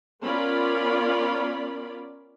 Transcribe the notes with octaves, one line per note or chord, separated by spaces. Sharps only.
B3 C#4 F4 A#4 D5 B5